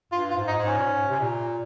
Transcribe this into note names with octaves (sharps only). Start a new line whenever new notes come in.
G2 F4
F4
G#2
D#4
G#2
C#4
A#2
G#2
C3
A#2